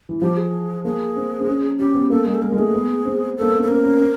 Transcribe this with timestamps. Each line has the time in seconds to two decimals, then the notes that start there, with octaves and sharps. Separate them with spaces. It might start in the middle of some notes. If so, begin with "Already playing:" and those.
0.09 E3
0.21 F3 G4
0.37 G#4
0.85 A#3 G#4
1.16 C4
1.40 C4
1.47 C#4
1.79 C#4 G4
1.95 B3
2.10 A#3 A4
2.25 G#3 G#4
2.34 A4
2.42 G#3 A#4
2.52 G#3
2.57 A3 G#4
2.74 B3
3.05 C4
3.37 A#3 A4
3.50 B3
3.59 C4 A4
3.68 C#4 A#4
3.84 C#4
4.00 C4